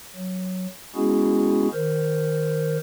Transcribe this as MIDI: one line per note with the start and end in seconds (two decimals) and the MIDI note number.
0.15 0.66 54
0.96 1.68 56
0.96 1.68 59
0.96 1.68 61
0.96 1.68 64
0.96 1.68 66
0.96 1.68 68
1.73 2.78 51
1.73 2.78 70
1.73 2.78 72